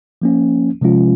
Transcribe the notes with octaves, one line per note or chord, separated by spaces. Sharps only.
F3 A#3 C#4
C3 F3 G#3 C#4 F4